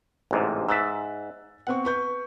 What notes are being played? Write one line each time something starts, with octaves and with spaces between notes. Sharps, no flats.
A1 G#2 C3
G#2 E5 E6 F#6 A6
B3 C4 F#5 C#6
B4 C#6 G6